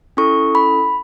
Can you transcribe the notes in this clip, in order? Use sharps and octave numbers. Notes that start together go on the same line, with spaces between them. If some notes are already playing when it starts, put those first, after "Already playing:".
C#4 E4 A4 C#6
B5